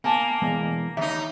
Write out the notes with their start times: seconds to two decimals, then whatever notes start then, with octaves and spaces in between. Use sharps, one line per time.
0.04 A#3 B3 G#5 A5
0.42 E3 G#3 B3
0.97 D#2 D#4 E5